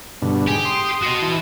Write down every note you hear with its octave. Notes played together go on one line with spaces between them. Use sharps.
G2 B2 D3
G#2 G4 G#4
C6 D#6
F#4 D#5
E3